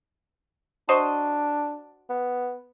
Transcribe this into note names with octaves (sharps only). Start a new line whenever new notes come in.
D4 F#4 C5 D#5
B3